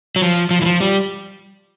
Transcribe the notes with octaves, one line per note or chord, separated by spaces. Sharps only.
F#3
F3
F3
E3
F3
G3